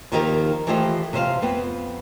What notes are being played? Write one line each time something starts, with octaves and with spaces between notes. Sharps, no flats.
D#2 D#3 F3 D#4 G4 A#4
E3 F3 A3 G4 C5 D#5
C3 F3 C5 F5
F2 B3 C4